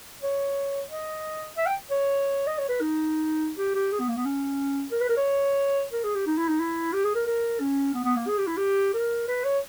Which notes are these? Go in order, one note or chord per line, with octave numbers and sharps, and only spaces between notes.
C#5
D#5
E5
G5
C#5
D#5
C#5
B4
D#4
G4
G4
G#4
B3
A#3
B3
C#4
A#4
B4
A#4
C#5
A#4
G#4
G4
D#4
E4
D#4
E4
G4
G#4
A#4
A#4
C#4
B3
B3
A#3
G#4
G4
E4
G4
A#4
B4
C#5